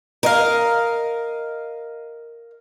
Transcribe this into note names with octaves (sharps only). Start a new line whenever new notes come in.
A#4 D#5 F5